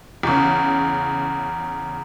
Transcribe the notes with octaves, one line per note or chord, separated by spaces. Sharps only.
E2 C#3